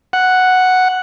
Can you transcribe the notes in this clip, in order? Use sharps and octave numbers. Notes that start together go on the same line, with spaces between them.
F#5